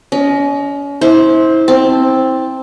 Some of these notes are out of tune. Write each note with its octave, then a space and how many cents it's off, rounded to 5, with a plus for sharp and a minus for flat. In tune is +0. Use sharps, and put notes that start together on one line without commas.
C#4 +35 D#5 +0
E4 -30 C5 +10
C4 +5 A5 +0